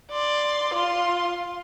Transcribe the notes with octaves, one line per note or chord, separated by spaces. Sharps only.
D5 C6
F4 C6